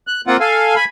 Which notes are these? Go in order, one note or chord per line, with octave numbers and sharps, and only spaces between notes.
F#6
A#3 C4 F4 F#5
A4 F5 G#5
G#5 B5